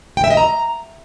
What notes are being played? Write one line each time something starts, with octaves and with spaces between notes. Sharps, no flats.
G5
E5
D#5
A#5